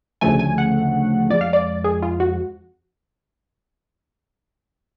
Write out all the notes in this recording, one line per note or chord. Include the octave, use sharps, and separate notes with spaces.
D2 C#3 F3 A3 G#5
G#5
F#5
F2 F3 G#3 D5
F5
D5
G#4
F4
F#4